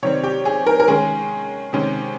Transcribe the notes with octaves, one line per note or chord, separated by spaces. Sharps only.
C3 D#3 G3 C4 C#5
G4
G#4
A#4
A#4
D#3 G#3 C#4 G#4
C3 D#3 G#3 C#4